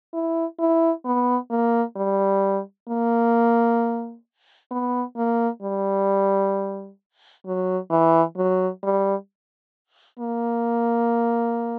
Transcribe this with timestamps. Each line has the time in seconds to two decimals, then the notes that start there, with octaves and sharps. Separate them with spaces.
0.13 E4
0.59 E4
1.05 B3
1.51 A#3
1.96 G3
2.88 A#3
4.71 B3
5.16 A#3
5.62 G3
7.46 F#3
7.91 E3
8.37 F#3
8.83 G3
10.19 A#3